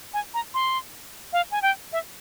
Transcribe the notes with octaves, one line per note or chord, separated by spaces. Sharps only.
G#5
A#5
C6
F5
G#5
G5
E5